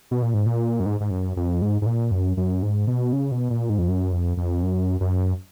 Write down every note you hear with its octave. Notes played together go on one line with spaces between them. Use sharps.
B2
A#2
G#2
A#2
F#2
G#2
G#2
F#2
F2
G#2
G#2
A#2
F#2
F#2
G#2
B2
C#3
B2
A#2
G#2
F2
F#2
F2
F2
F#2
F#2